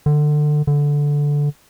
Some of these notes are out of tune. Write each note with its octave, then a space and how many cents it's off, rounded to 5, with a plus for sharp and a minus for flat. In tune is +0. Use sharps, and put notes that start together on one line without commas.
D3 +25
D3 -10